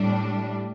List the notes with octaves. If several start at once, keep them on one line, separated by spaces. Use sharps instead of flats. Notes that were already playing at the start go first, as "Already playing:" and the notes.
Already playing: A2 G3 D4